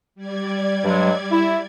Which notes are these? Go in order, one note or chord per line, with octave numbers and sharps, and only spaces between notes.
G3 D5 G#6
G2 F#3 G#3
E4